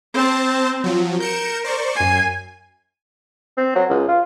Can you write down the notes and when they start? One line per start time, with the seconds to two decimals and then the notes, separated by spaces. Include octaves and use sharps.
0.14 C4 C5 A5
0.84 F3 F#3
1.20 A#4 G6 C#7 E7
1.64 C5 D5 C#6
1.96 F#2 G#5 C7
3.57 C4
3.75 F#3
3.89 C#2
4.08 F4